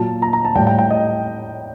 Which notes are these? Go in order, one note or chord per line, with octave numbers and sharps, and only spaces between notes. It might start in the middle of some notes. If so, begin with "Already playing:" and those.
Already playing: A#2 F#3 A5
A#5
A#5
A5
A2 G3 G5
G5
G5
D#5